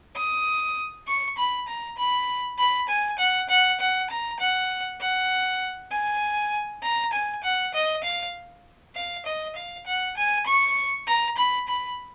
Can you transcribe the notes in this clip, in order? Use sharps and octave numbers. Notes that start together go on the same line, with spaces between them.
D#6
C#6
B5
A#5
B5
B5
G#5
F#5
F#5
F#5
A#5
F#5
F#5
G#5
A#5
G#5
F#5
D#5
F5
F5
D#5
F5
F#5
G#5
C#6
A#5
B5
B5